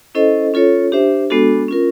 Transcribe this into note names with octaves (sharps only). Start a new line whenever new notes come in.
C#4 E4 A4 C5 D#5
C#4 F4 A4 C#5
D4 G4 C5 E5
G#3 B3 D4 F#4 A4
C#4 F4 A#4